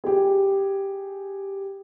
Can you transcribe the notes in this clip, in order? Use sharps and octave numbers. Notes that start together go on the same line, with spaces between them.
G4 G#4